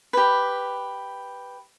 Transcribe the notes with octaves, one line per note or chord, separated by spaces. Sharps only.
G4 B4